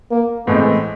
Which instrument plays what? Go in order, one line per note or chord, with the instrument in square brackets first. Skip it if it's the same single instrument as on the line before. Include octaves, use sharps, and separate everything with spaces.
[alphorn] A#3
[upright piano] A2 E3 G#3 C4 [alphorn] B3